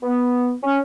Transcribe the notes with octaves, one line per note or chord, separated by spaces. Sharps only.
B3
C#4